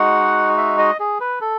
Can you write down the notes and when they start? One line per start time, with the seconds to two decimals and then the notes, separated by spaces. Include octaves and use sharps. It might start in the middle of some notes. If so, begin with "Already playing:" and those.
Already playing: G#3 D#4 F#4 F#5
0.57 E5
0.78 D#5
1.00 G#4
1.20 B4
1.41 A4